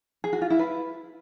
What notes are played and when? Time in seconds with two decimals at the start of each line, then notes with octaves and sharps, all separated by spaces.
0.24 G#4
0.33 F#4
0.42 F4
0.50 E4
0.59 B4